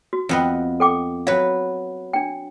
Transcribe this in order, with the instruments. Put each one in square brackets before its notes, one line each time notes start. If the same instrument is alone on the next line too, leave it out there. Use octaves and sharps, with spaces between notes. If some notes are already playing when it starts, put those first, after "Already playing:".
[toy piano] F#4
[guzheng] F2 B3 D#5
[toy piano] A4 G5 D6
[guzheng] F#3 B4 [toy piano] F5
[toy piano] D4 G5